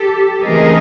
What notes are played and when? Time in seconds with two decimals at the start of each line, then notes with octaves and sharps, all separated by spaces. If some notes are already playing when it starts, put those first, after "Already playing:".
Already playing: G4 A4
0.41 C#3 E3 A3 C4 D#4 G#4 A#4